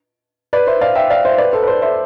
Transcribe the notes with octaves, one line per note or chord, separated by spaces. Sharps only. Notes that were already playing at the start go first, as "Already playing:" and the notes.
B4 D5
C5 E5
D5 F5
E5 G5
D5 F5
C5 E5
B4 D5
A4 C5
B4
A4 C5
C5 E5